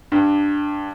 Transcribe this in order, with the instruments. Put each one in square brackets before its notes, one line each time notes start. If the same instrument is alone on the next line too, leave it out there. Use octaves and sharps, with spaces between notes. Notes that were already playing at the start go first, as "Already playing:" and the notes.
[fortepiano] G2